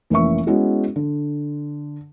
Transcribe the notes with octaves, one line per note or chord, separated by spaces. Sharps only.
F1 E3 A#3 C#4 E5 C#6
G#3 B3 C#4 E4 F#4
D3